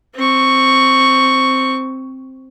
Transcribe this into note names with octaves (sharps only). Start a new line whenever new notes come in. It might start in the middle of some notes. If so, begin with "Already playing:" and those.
C4 C#6